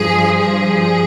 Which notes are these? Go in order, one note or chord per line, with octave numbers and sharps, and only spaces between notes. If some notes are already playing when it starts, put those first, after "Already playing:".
Already playing: G2 F3 G#4
G#4